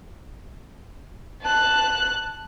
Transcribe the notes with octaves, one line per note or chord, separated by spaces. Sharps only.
A5 F#6